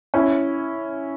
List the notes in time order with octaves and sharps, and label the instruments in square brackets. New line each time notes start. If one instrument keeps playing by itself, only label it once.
[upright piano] C#4 E4